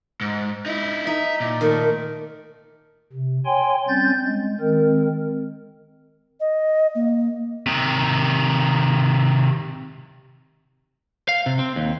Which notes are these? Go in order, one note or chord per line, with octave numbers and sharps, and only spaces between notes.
G#2
D#4 E4
D#4 E5
A#2
D#3 A3
C3
C#5 G5 G#5 C6
G3 C4 C#4 G6 A6
G#3
D#3 G#3 C4 A#4
D#5
A#3
C3 D#3
F5
C3
C4
D#2